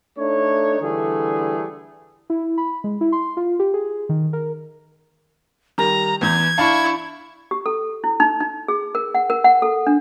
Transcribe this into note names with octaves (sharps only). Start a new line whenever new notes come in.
A3 D4 D#4 C#5
D3 E3 G3 A3 G#4
E4
B5
G#3
E4
C6
F4
G4
G#4
D#3
A#4
D#3 G3 A#5
E2 E3 G6 G#6
D4 E4 F5 A5 C#6
G4
A4
E4
D#4
D#4
G#4
A#4
F#5
A#4
F#5
A4
D4